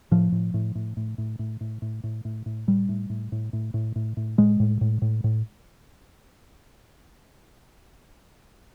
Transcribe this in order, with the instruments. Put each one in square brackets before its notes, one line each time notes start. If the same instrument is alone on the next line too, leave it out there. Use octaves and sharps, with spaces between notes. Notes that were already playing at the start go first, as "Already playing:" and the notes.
[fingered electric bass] A2 F3
A2
A2
A2
A2
A2
A2
A2
A2
A2
A2
A2
A2 G3
A2
A2
A2
A2
A2
A2
A2
A2 G#3
A2
A2
A2
A2